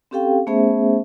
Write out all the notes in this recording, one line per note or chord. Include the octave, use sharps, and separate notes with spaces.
C4 C#4 G4 A4 F5 G5
A3 B3 C#4 G#4 C5 E5